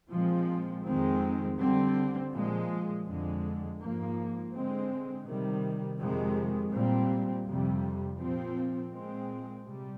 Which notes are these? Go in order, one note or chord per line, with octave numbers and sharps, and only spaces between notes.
A#2 F3 G#3 C4
F2 D#3 G#3 C4
D3 G3 C4
A#2 F3 G#3
F2 D3 G#3
G#2 F3 A#3
D3 G#3 C4
C3 D#3 G3
F2 C3 D#3 G#3
A#2 G3 C4
F2 C3 G3
A#2 F3 C4
A#2 G#3 C4
C3 G3